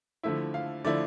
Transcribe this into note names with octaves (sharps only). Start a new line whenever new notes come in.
D3 F3 A3 E4 E5
F5
D3 F3 A3 E4 D5